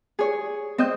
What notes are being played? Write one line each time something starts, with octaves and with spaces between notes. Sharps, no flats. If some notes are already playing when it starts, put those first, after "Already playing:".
G#4 C#5
C4 D#5 G6